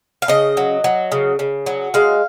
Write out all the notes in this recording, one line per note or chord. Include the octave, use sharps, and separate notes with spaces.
F5
C#3 D#5
F#3
F#3
C#3
C#3
F#3
G#3 F5